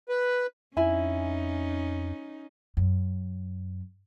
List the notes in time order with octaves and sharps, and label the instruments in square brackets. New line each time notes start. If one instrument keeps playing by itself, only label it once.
[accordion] B4
[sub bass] F2 [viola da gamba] C#4 D#4 [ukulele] E4 G#5
[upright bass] F#2